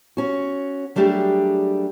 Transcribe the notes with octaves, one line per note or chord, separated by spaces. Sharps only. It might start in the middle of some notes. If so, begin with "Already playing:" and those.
C#4 F#4
F#3 G3 A3 D4 G4 G#4